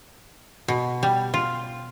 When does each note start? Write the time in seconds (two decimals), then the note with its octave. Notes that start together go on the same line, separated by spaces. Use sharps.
0.68 B2
1.03 G3
1.34 F4